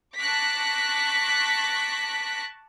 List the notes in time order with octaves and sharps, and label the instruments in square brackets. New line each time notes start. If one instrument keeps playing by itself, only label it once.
[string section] A5 C#6 D6 F#6 A#6 B6